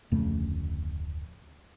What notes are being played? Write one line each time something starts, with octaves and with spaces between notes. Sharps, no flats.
D1 F2 C#3 A3